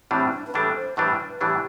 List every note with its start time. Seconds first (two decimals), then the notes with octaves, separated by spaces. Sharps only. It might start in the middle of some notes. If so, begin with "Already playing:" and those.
0.11 A2 E3 G3 C4 D4
0.32 D4
0.47 B4
0.54 A2 E3 G3 D4 A4
0.75 C5
0.97 A2 E3 G3 D4 B4
1.40 A2 E3 G3 D4 G4